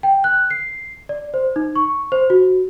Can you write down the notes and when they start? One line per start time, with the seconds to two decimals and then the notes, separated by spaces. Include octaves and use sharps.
0.03 G5
0.24 F#6
0.50 C7
1.09 D5
1.34 C5
1.56 D#4
1.76 C#6
2.12 C5
2.30 F#4